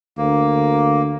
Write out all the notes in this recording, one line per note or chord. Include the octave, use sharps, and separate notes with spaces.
D2 A#3